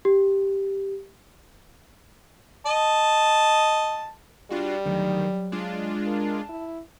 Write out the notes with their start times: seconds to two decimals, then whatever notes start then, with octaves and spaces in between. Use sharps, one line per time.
0.05 G4
2.66 D#5 A5
4.50 G3 D4 F4 F#4
4.85 D2 D#3 F#3
5.52 G#3 D4 F4
6.06 A#4 A5
6.49 E4